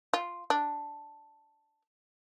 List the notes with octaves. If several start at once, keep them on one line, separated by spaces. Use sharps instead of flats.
F4
D4